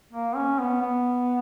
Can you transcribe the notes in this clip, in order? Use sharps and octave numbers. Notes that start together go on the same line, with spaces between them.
A#3
C#4
B3
B3